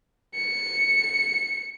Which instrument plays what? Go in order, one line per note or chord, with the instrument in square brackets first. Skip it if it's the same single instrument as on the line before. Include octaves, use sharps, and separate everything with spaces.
[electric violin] C#7